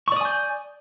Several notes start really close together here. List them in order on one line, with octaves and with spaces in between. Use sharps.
C#6 D5 D#6 G#5 G6